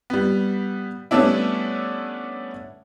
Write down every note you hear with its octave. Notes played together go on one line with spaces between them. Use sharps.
G3 B3
G3 A3 B3 C#4 D4 E4